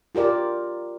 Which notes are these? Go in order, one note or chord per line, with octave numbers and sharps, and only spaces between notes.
F4 G4 A#4 D5